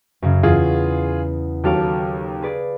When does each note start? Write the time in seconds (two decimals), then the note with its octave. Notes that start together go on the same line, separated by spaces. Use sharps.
0.22 F#2 C#3
0.43 E2 F4 G#4 G#6
1.64 D#2 F#3 A4 F5 D6
2.42 G#4 B4 D5